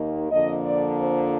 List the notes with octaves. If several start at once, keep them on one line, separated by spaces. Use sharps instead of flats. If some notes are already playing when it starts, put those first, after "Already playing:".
Already playing: D#2 D#3 A#3
F2 D3 F3 A#3 D#5
D5
C5